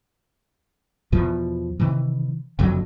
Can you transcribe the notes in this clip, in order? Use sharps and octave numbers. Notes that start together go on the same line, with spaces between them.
E2 B2 F3
C3 D#3 E3
F#1 F2 D3 F#3